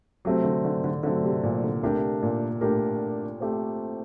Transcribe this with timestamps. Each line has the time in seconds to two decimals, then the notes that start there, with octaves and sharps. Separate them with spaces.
0.25 C3 F#3 A3 C4
0.44 D3
0.65 D3
0.84 D3
1.03 D3 F#3 A3 C4
1.24 C3
1.43 A#2
1.64 D3
1.83 C3 A3 D4 G4 A#4
2.23 A#2
2.61 A2 A3 D4 G4 A#4
3.40 A3 C4 G4 C5